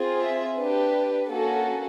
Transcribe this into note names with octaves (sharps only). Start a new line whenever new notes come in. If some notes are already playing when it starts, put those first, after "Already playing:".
Already playing: C4 F4 G#4
E5
D4 G4 B4
A#3 C#4 F#4 A4